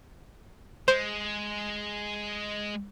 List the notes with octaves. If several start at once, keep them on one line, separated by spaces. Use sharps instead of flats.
G#3 C5